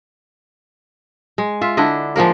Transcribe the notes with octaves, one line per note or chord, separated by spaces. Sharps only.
G#3
F4 E5
D3 D4 E4 D#5
F3 G#3 A#3 A#4